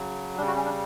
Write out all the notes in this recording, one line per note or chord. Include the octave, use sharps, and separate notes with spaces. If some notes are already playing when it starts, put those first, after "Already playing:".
Already playing: C#3 F#3
C#3 G3 D4
F#4
C#4
D4